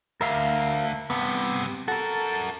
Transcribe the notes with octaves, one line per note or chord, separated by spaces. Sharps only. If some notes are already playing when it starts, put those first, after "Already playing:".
D2 A#4 E5 F5
G2 C3 B3
F#4 A4 A#4